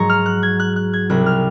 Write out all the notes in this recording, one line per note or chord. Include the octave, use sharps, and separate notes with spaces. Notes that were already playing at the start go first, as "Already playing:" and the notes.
Already playing: G#2 F#3 A#5 C#6
F6
F#6
G#6
F#6
F#6
G#6
C2 C3 F#3 F#6
F6